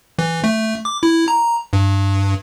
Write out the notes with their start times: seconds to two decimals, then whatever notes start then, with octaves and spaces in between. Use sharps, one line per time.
0.19 E3
0.44 A3
0.85 D6
1.03 E4
1.28 A#5
1.73 G2